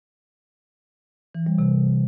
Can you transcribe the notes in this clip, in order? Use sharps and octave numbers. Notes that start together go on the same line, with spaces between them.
E3
G3
C3